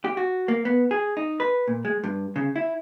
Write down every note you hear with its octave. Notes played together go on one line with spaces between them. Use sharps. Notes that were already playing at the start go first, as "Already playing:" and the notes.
G4
F#4
A#3
B3
G#4
D#4
B4
A#2
G#3
G2
C#3
E4